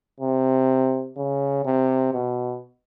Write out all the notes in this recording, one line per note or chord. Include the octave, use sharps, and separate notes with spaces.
C3
C#3
C3
B2